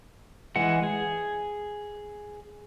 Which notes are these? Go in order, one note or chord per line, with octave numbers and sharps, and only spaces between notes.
E3 G#3 F#5
G#4